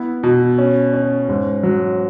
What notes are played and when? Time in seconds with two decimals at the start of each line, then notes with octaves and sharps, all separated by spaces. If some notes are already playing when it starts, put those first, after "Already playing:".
Already playing: B3 E4
0.23 B2
0.58 C#4
0.93 C#4
1.29 G#2
1.63 F#3